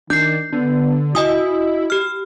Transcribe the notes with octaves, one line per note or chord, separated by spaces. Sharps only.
D#3 D4 G6 C7
D3 B3
E4 F#4 D#5 G#5 D#6
G4 F6